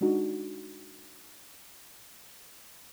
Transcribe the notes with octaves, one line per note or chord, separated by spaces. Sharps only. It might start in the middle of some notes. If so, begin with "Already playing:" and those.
G#3 D4 D#4 F#4